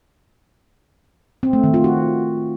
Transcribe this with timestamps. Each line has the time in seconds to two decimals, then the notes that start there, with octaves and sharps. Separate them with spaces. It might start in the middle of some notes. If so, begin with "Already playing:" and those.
1.43 C4
1.53 A3
1.64 D#3
1.74 F4
1.84 F#4